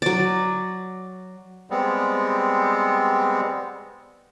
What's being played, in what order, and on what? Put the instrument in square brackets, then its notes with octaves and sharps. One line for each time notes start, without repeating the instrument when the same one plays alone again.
[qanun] F#3 D5
[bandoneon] G3 G#3 B3 C4